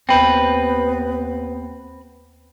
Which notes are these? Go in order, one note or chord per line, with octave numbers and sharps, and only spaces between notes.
D#2 B3 C4 B4 G5 G6